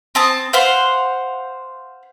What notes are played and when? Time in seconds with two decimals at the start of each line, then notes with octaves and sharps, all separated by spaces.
0.15 C4 A5 D#6
0.53 C5 F5 F#5 C6